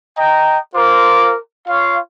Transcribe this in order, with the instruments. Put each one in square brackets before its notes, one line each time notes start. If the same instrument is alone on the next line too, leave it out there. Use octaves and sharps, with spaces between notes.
[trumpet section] D#5 G5 A#5
F4 A#4 C5 D6
F4 C#5 F5